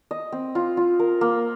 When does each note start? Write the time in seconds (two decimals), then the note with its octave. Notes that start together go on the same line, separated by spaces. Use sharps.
0.11 D#5
0.32 C4
0.55 F4
0.77 F4
1.00 A#4
1.21 A#3